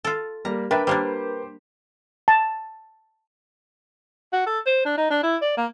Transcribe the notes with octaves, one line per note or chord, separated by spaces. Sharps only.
F4 A4
G3 A#3 A#5
D4 A#4 B4 E5 G5
G3 A#3 D4 G4 C5
A5
F#4
A4
C5
D4
D#4
D4
E4
D5
A#3